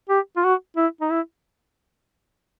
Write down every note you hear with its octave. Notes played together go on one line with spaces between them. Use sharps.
G4
F4
F#4
E4
D#4
E4